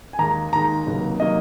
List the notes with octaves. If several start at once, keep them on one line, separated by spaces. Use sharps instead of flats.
G#5
D#2 D#3 G#3 A#5
D#2 D#3 G#3 A#5
C#2 C3 D#3 F#3 A#3
C3 D#3 F#3 A#3 D#5